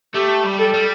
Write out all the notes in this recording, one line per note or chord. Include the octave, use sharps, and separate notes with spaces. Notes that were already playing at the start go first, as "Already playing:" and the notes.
A3 G4
G3
A4
G3